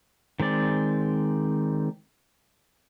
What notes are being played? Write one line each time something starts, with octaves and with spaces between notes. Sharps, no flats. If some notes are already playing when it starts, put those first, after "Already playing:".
D#3 G#3 C4 D5